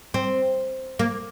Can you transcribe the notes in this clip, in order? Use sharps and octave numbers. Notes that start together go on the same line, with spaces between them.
C4
A#3